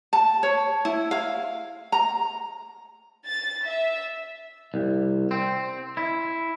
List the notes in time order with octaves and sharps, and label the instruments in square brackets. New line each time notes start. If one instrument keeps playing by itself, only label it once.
[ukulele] A5
C#5
E4
F5
A#5
[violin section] A6
E5
[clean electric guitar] C2
C4
E4